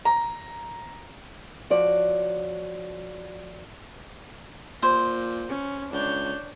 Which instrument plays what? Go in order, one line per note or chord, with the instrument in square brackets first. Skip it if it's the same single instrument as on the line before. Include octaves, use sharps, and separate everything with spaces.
[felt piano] A#5
[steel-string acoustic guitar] F3 F#4 C#5 D5
[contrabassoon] A#2 [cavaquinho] C5
[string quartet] C#4
[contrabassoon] C#2 [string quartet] D4 C#5 G6